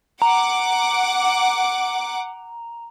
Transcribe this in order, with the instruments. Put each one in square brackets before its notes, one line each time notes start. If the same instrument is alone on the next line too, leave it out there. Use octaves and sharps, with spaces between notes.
[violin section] F#5 D6 [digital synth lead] A#5